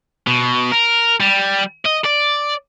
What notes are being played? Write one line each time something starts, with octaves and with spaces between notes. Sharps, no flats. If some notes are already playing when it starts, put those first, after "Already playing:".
B2
A#4
G3
D#5
D5